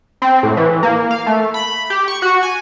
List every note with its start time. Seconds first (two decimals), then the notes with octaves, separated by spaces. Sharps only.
0.22 C4
0.43 A2
0.57 E3
0.83 A#3
1.11 F5
1.26 A3
1.54 B5
1.90 G4
2.08 C#6
2.22 F#4
2.43 G#5